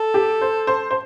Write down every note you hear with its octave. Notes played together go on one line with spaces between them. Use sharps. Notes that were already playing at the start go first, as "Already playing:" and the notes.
Already playing: A4
G4
C5
C5
C5